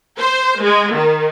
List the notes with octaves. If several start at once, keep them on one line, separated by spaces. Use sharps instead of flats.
C5
G#3
D#3